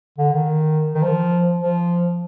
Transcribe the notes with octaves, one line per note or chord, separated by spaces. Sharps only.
D3
D#3
D#3
F3
F3